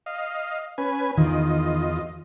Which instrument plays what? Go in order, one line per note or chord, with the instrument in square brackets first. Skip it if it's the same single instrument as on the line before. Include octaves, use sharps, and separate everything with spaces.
[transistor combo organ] D#5 F5
C#4 B4 G#5
[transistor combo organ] E2 F4 D#5 [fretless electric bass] D#3